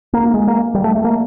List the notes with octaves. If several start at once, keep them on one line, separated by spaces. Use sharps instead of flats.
A#3
G#3
A#3
G3
A3
A3
A#3